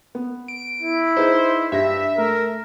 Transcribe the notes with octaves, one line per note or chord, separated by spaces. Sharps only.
B3
D7
E4
D#4 G#4 B4 C5
G2 G4 E5 A#6
A3 A#4